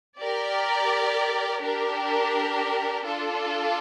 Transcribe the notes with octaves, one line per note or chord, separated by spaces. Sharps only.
G4 A#4 D5
D4 G4 A#4
D4 F4 A4